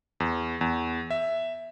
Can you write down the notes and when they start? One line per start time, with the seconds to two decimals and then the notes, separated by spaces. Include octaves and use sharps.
0.20 E2
0.61 E2
1.11 E5